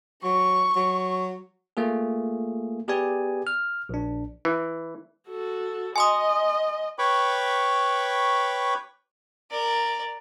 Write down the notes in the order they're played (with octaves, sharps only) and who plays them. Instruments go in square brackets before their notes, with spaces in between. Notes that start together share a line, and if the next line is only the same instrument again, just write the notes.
[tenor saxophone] F#3 [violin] C#6
[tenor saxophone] F#3
[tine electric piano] A3 A#3 F4 G#4
B3 G4 G#4 B4 D5 G#5
F6
A#1 D4
[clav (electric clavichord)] E3
[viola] F#4 A4
[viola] D#5 [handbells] G#5 C6 D#6
[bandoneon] B4 C#5 G5 B5 C#6 D6
[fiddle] A#4 D5